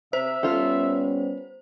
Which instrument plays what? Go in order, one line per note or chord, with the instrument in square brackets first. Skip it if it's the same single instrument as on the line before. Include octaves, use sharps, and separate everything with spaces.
[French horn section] C3 [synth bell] C5 [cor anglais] E5
[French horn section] G3 B3 C#4 [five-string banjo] F4 A4